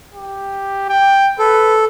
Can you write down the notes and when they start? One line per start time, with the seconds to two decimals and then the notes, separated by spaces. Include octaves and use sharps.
0.14 G4
0.89 G5
1.39 A4 B4